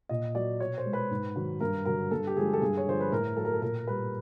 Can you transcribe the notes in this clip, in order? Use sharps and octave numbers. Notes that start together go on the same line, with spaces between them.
A#2 D#5
F#3 D5
B2 C#5
C5
G#3
B4
G#2
D#3 F#3
G2 A#4
D3 F#3 A#4
G2 A4
G4
D3 F3 G#3 G#4
A4
G2 G#4
C#5
D3 F3 C5
B4
A2 A#4
F#3 A4
A#4
A4
A#2 A#4
G3 B4